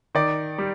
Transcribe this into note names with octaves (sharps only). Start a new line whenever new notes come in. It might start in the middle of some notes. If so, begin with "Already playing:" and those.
D#3 D5
G3